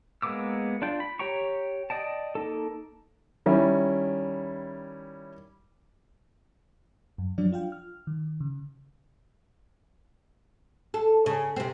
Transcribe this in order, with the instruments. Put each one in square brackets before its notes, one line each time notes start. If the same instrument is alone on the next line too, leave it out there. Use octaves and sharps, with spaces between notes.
[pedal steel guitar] G#3 A#3 B3 D6 E6
D4 F4 G5
B5
G4 C#5 G5 A#5 C#6
D5 D#5 G5 A5
A#3 D#4 A4
[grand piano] D#3 G3 C#4 E4
[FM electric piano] F#2
F3 F#3 D4 F#4 D5
D4 F4 F5 G5
F6
D#3
C#3
[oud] A4
C#3
C3 C4